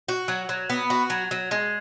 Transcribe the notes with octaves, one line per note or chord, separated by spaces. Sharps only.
F#4
F#3
F#3
B3
F#4
F#3
F#3
G#3